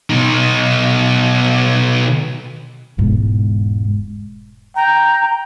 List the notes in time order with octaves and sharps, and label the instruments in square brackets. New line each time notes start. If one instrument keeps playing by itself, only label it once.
[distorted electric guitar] B2 D#4
[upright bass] E1 G#2
[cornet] G5 [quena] A#5